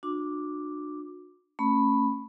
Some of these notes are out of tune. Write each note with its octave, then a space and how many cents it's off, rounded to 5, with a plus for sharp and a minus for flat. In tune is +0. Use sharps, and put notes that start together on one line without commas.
D4 +25 F#4 -35 D6 +0
A3 +30 C#4 -15 B5 +0